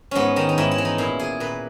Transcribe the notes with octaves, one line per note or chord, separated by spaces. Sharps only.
G#2 B3 C#4
D#3 D#4
D#4
G#2 E4
E4
E3
D#4
A#2 E4
G#4
A#2 B4